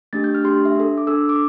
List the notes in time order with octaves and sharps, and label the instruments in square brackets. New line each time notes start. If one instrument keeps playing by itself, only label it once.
[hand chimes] A3 D4 G4 A6
G6
F6
A3 D4 G4 C6
E5
D4 A4
D6
D4 A4 E6
D6